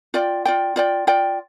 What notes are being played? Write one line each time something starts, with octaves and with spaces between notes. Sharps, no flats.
F4 D5 G5
F4 D5 G5
F4 D5 G5
F4 D5 G5